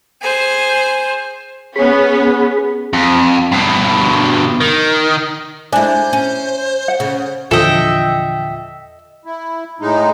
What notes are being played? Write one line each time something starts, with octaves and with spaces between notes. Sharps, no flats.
G#4 C5
B3 C#4 G#4 B5
F2
G2 B2
D#3
G#3 D4 E4 C5 G#5
C#4
F#5
C#3
E2 A#2 D3 F3 A4 D#5 E5 G5
E4
A2 G#3 D#4